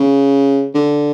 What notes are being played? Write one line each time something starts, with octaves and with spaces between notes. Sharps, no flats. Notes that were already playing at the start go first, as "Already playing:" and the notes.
Already playing: C#3
D3